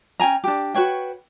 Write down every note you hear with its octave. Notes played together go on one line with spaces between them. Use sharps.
C#4 G5 G#5 A#5
D4 G4
F#4 B4 C#5 G5